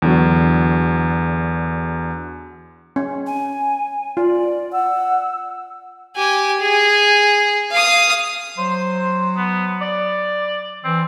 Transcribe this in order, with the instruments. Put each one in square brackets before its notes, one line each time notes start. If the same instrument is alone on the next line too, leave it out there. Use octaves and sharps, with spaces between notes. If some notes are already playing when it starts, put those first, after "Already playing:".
[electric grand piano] E2 D3 F#3
[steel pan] C#4
[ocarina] G#5
[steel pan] F4 [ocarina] D5
[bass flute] F#5 [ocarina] E6
[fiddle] G4 G#5
G#4
F5 D#6
[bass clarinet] F#3 [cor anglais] C5
[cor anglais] B3
D5
[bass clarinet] E3 [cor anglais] C4